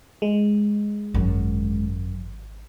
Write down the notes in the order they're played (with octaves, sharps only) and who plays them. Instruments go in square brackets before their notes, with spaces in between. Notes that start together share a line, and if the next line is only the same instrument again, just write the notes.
[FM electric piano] G#3
[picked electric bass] G#1 [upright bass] F#2